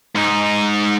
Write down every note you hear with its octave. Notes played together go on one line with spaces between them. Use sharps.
G#2 D#4